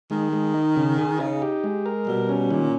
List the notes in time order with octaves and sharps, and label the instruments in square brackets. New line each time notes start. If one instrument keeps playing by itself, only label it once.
[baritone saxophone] D#3 [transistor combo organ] G#3
[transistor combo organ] G#3
D#4
C#3
G#4
[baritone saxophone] C#3 [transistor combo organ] D#4
[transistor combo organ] G4
G#3
A#4
[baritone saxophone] B2 [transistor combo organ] G3
[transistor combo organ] C#4
[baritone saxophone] A#2 [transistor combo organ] D#3